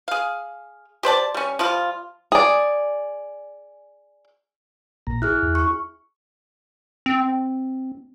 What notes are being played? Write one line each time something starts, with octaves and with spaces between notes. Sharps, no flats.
G#4 F5
G4 C5 D5 A5
G3 C#4
F3 G3 F4
G#4 D5
A#1 A#2 A#5
E4 G#4 F6 F#6
E2
C#6
C4